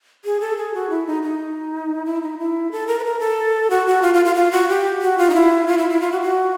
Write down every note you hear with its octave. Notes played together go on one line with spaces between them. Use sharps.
G#4
A4
G#4
F#4
E4
D#4
D#4
E4
D#4
E4
A4
A#4
B4
A#4
A4
F#4
F#4
F4
F4
F4
F4
F#4
G4
F#4
F4
D#4
E4
F4
E4
E4
F4
F#4
F#4